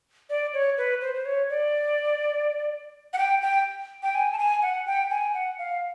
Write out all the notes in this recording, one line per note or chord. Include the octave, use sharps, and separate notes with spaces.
D5
C#5
B4
C5
C5
C#5
D5
F#5
G5
G5
G5
G#5
A5
G#5
F#5
G5
G#5
F#5
F5